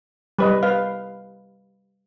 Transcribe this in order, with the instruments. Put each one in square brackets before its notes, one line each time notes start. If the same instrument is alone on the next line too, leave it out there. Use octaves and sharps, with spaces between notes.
[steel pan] G3 B4 D#5
B4 F5